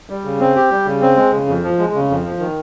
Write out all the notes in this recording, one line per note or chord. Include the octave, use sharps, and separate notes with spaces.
G3
C#3
C4
G4
G3
C#3
C4
G#3
C#3
F2
F3
G#3
C#3
F2
F3
D#3